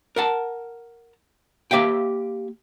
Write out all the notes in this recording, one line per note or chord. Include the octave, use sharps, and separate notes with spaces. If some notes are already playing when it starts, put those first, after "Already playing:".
A#4 F#5 A5
A#3 G4 E5 F5 G5